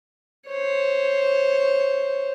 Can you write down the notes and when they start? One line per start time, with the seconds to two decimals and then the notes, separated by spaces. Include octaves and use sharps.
0.49 C5 C#5